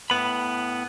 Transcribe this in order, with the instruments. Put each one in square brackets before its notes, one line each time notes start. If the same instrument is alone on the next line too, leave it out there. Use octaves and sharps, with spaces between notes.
[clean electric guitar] A2 B3 B5